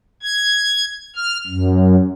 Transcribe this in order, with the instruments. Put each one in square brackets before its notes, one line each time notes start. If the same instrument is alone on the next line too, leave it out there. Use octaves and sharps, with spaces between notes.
[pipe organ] G#6
F6
F#2